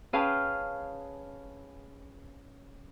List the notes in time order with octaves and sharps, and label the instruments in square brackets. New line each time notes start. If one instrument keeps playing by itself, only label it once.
[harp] C#4 G#4 B4 F5 G5 A5